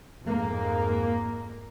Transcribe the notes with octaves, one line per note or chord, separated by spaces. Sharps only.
F2 G#2 A#3